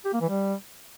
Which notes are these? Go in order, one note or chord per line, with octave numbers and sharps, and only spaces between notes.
G4
A#3
E3
G3